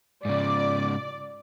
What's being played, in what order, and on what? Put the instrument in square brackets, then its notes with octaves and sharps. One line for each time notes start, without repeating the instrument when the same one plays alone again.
[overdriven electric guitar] G#2 C#3 [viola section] D5